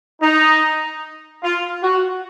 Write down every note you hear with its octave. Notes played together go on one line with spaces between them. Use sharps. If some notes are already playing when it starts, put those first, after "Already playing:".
D#4
F4
F#4